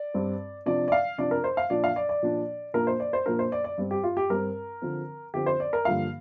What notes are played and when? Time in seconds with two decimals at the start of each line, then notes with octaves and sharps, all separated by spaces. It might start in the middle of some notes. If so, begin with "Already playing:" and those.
Already playing: D5
0.14 G2 G3 C4
0.66 C3 F3 D4 D5
0.88 D5
0.92 F5
1.18 C3 F3 D4 D5
1.31 A#4
1.44 C5
1.57 F5
1.70 A#2 F3 D4 D5
1.84 F5
1.96 D5
2.09 D5
2.22 A#2 F3 D4
2.74 A#2 F3 A#3 D4 A#4
2.87 C5
3.00 D5
3.13 C5
3.26 A#2 F3 A#3 D4 A#4
3.39 C5
3.52 D5
3.64 D5
3.78 G2 G3 C4
3.91 G4
4.04 F4
4.17 G4
4.30 G2 G3 C4 A#4
4.82 D3 F3 C4
5.34 D3 F3 C4 G4
5.46 C5
5.60 D5
5.73 A#4
5.85 G2 D3 F3 A#3 F5